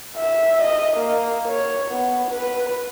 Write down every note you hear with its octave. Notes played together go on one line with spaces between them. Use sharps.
E5
D#5
A#3
C#5
B3
B4